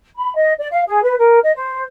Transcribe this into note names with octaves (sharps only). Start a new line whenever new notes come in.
B5
D#5
D5
F5
G#4
B4
A#4
D#5
C5